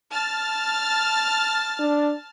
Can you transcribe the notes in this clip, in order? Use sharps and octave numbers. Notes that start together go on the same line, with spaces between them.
A5 F6 A6
D4